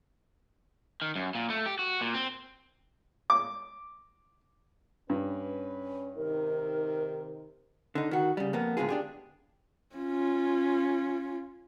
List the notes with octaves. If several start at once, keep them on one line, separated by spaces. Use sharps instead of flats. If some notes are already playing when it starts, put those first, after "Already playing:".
D#3
F#2
A#2
A3
G4
F#4
A#2
C4
D6
G2 C#4 B4
C3 D#3 D#4 A#4
D3 D#4
D#3 F#4
C#3 G3
F2 A#3 B3
A2 D3 G#3 B3 F4 G#4
D4 G4 G#4
C#4 F4